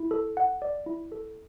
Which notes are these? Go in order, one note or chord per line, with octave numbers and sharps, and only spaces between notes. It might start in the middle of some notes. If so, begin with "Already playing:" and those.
Already playing: E4
A4
F#5
D5
E4
A4